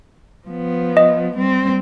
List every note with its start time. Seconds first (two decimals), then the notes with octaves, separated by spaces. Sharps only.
0.48 F3 B3
0.97 D#5
1.37 G3 C4